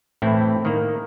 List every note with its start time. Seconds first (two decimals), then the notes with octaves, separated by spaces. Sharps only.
0.22 A2 E3 C4 E4
0.65 D#3 A#3